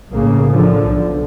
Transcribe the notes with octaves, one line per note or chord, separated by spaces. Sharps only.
B1 A2 C#3 A#3
D3 F3
B1